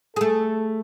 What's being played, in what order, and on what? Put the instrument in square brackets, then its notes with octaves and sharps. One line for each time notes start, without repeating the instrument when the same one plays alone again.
[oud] A3 G#4 [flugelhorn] A4